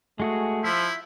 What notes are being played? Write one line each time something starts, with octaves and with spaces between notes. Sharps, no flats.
G#3 A3 F#4 G#4
F3 E4 E5